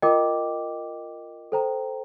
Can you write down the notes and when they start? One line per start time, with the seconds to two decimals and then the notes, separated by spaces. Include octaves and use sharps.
0.02 F4 A#4 D#5 G5 D6
1.52 A4 C5 G5 A#5